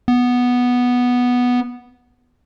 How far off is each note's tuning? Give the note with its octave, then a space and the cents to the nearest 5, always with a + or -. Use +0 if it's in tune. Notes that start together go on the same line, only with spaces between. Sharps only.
B3 -5